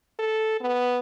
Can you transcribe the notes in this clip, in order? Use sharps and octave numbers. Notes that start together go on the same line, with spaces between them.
A4
B3